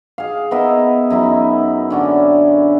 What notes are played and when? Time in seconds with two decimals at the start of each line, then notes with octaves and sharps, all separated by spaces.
0.18 G#4 F5
0.51 B3 A#4 D#5 E5
1.10 F#2 D#4 E4
1.90 D3 C#4 D4